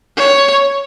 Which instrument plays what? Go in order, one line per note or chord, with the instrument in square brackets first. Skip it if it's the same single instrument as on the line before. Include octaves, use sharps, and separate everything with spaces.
[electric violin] C#5